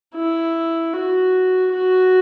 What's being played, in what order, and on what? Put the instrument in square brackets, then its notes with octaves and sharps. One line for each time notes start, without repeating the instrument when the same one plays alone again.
[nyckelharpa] E4
F#4
F#4